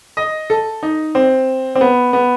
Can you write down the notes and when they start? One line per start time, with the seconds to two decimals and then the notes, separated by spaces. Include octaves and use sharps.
0.17 D#5
0.50 A4
0.83 D#4
1.15 C4
1.75 C4
1.81 B3
2.13 B3